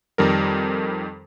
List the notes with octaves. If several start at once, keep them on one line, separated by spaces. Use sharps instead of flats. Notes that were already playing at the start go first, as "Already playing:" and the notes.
F2 D#3 G3 A4 A#4